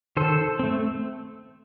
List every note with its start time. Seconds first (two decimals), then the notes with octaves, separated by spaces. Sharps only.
0.17 D#3 A4 C5
0.59 A3 C4